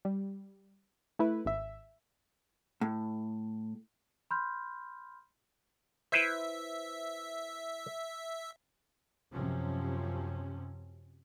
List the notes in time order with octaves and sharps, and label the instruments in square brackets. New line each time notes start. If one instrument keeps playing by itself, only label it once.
[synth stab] G3
A3 E4 B4
G#1 E5
[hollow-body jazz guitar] A2
[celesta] B5 C6 F6 G6
[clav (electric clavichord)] E4 B4 C5 [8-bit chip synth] E5
[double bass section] F#2 C3 F3 C#4